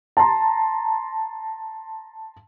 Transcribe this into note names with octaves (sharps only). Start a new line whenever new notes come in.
A5 A#5 C6